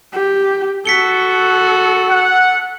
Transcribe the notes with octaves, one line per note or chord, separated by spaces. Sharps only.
G4
F#4 A4 B6 C#7 G7
F#5